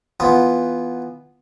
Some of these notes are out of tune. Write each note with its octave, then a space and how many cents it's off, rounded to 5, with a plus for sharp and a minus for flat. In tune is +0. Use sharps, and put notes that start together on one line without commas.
E3 +0 B3 +0 F4 +0